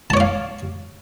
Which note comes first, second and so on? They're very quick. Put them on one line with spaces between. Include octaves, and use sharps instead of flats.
A5 C#5 D6 F5